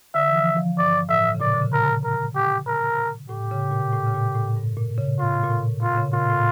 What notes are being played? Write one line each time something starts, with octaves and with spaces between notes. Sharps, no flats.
D3 E5
E3
F3
F3
G2 D5
A2 E5
C#3
A#2 D5
D3
C#3
A#4
A#2
A#4
G4
A#4
A2 G4
C#3
A#2
A2
C#3
A#2
A2
G2
A#2
C#3
A2 F4
A#2
A2
A#2 F4
C#3
A#2 F4
A2